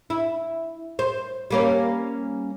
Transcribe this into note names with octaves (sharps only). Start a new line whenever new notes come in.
E4
C5
G3 A#3 C#4